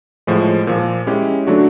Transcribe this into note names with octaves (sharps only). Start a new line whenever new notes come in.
A2 F3 G#3
A#2 F3 A#3
G#3 C#4 E4 G4
D3 F#3 A3 D4 F#4